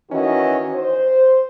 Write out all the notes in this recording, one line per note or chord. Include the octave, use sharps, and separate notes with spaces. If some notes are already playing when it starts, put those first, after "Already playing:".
D#3 E3 C#4 F#4 D#5
C5